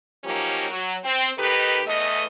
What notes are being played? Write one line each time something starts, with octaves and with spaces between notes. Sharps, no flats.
F3 F#3 A#3 C#4 D#4 G4
F#3
C4
D#3 D#4 G4 A4 B4
E2 A3 D#5